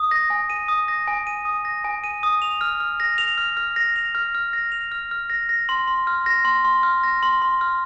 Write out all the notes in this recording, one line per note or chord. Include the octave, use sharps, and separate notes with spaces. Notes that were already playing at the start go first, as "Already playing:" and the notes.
Already playing: D#6
A#6
G#5
D#7
D#6
A#6
G#5
D#7
D#6
A#6
G#5
D#7
D#6
F7
F6
F6
A#6
F7
F6
F6
A#6
F7
F6
F6
A#6
F7
F6
F6
A#6
A#6
C6
C6
F6
A#6
C6
C6
F6
A#6
C6
C6
F6